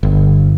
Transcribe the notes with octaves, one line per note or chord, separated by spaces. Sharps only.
G1